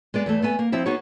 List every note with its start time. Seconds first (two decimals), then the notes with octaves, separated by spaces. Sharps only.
0.14 G#3 B3 D5
0.26 E2 E3 A3
0.42 A3 B3 G#5
0.59 A#3
0.72 F3 C4 E4 E5
0.86 B3 D#4 F#4 G#4 C#5